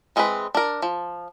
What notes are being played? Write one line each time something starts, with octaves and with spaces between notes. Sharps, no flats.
E3 G#3 C4 E4 B4
D4 A#4
F3